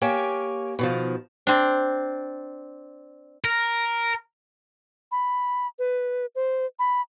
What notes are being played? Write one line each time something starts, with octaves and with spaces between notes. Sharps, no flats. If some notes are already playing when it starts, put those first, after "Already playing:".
A#3 G4 C#5 G#5
B2 D#3 F3
C4 D4
A#4
B5
B4
C5
B5